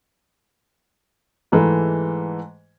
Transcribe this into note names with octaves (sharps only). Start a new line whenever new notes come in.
G#2 E3 G#3 A3